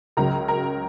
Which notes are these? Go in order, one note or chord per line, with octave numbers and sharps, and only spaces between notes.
C#2 C#3 F#3 A#4 A#5
A#4 A#5